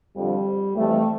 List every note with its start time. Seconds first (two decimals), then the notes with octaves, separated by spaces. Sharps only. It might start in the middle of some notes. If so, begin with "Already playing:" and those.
0.16 F2 D3 F3 G3
0.76 F2 E3 G3 A3